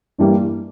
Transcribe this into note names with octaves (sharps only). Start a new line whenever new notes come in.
G2 E3 G3 A#3